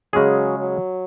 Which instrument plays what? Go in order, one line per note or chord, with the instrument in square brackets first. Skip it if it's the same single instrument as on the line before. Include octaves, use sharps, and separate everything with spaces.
[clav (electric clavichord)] C#3 G#3 C#4 G#4 [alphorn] F#3
[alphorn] F#3